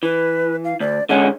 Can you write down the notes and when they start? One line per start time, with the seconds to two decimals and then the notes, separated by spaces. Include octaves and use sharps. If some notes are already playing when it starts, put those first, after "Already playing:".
0.03 E3 B4
0.64 F5
0.80 D2 D5
1.09 D3 G#3 C#4 F#5